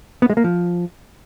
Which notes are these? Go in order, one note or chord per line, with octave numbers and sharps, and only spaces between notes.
B3
G#3
A#3
F3